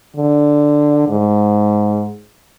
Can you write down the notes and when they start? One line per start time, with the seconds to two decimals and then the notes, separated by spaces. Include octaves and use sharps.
0.16 D3
1.09 G#2